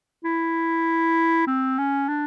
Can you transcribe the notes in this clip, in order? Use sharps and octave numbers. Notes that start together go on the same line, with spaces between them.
E4
C4
C#4
D4